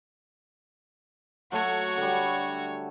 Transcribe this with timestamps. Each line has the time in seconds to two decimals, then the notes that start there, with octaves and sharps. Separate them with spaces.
1.52 F#3 A3 F#4 A4 C#5
1.97 D3 G3